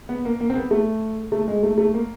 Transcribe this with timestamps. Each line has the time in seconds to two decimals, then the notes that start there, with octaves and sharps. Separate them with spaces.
0.09 B3
0.25 A#3
0.40 A#3
0.50 C4
0.56 B3
0.71 A3
1.32 A3
1.48 G#3
1.63 A3
1.78 A3
1.94 A#3